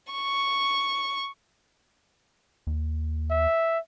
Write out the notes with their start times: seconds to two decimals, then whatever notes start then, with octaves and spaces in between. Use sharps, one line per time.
0.12 C#6
2.67 D#2
3.30 E5